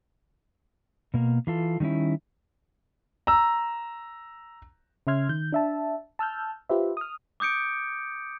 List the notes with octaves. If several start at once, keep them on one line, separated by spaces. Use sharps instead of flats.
B2 A#3 A#4
E3 F4 A4
D#3 G3 C4 C#4 E4
A#5 E6
C#3 C#4 E5 C6 F6 G#6
D#3 G6
D4 E5 A5
A5 E6 F6 G6
F4 G4 B4 C5 E5
D#6 F6
D6 D#6 G6 C#7 D7